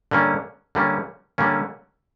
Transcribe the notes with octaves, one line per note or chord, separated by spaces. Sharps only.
D3 G3 A#3 C#4
D3 G3 A#3 C#4
D3 G3 A#3 C#4